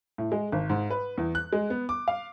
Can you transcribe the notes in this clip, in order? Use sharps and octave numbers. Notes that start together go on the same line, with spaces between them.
A2
G#3
G#1
G#2
B4
E2
F#6
G#3
B3
D6
F5